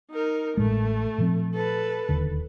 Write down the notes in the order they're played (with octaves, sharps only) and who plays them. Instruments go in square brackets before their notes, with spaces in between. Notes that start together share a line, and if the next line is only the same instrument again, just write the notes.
[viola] D#4 A#4
[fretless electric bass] A1 A2 G#3 [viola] A3
[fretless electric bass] A#2 F3 C4
[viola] A4 B4
[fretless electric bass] D1 D#2 D3